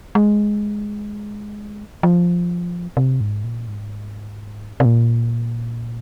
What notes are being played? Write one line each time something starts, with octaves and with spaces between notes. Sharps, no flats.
G#3
F3
C3
G#2
A#2
G#2
C3
A#2